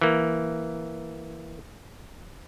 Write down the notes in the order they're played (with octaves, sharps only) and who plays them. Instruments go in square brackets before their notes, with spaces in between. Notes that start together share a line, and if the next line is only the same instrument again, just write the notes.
[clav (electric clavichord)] E3 A#3